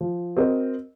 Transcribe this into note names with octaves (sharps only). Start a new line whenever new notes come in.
F3
C4 F#4 A#4 D#5